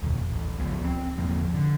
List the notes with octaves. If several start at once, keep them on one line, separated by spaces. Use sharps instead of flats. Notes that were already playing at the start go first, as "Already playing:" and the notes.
F1 D#2
A1
D1 C#2 F3 B3
C4
G1 E2 F3 A#3
D3